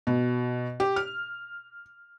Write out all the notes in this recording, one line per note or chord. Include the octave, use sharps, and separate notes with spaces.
B2
G4
F6